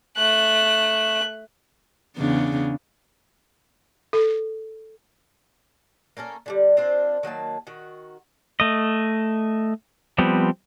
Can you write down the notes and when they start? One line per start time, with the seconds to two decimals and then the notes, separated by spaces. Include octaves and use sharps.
0.17 A3 F#6
2.17 E2 C#3 D4
4.13 A4
6.17 A#3 C#4 A4 A#4
6.46 D3 F3 G3
6.77 C4 D4 F4 C5
7.23 D#3 F#3 A#3 A5
7.67 D#3 F#4
8.60 A3 D#5
10.18 F3 G3 B3 C4